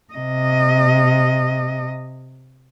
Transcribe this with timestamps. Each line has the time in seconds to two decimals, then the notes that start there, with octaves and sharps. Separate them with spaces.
0.14 C3 D#5